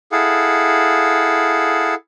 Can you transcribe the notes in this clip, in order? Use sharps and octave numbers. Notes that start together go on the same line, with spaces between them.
E4 G#4 A4 F5 F#5